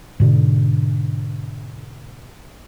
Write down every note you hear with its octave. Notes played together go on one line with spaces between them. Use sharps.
G#2 B2 D3